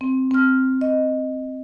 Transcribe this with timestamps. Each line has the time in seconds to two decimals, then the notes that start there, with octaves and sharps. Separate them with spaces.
0.01 C4
0.31 C4 F6
0.81 D#5